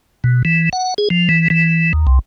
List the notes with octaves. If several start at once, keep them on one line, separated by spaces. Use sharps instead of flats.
B2
E3
F#5
G#4
F3
E3
E3
D#2
C2